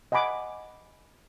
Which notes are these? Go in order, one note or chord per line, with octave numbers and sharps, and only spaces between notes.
D#5 F#5 G#5 B5 D6